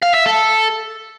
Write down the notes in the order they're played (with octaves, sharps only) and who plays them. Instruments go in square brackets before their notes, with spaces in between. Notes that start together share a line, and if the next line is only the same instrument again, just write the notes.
[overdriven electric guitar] F5
E5
A4